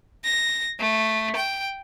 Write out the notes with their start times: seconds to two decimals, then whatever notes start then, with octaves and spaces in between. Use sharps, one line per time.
0.24 A#6
0.79 A3
1.36 G5